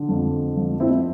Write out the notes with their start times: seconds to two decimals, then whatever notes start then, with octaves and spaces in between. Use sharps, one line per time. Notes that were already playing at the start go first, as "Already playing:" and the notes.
Already playing: D3
0.09 F2
0.56 F3
0.80 C4 E4